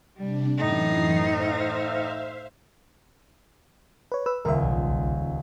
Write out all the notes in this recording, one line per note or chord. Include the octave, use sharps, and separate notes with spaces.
C3 G3 D4
F#2 A2 E3 D#4 C7
C5 E5 F5
B4 C#5
B4 E6
D#1 C#2 A#4 E5
B1